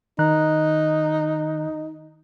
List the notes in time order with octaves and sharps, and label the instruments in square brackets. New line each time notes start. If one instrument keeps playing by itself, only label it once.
[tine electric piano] D#3 A#5 F#6 [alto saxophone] D#4